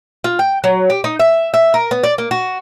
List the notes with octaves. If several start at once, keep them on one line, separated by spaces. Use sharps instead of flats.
F4
G5
F#3
G4
D#4
E5
E5
A#4
B3
D5
A#3
F#4